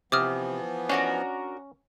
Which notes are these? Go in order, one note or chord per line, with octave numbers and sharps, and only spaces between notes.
C3 E3 F3 B3 D6 D#6 F6
C#4 D4 F#4 A#4